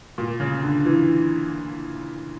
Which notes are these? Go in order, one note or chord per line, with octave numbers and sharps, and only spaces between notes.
A#2
C#3
D3
E3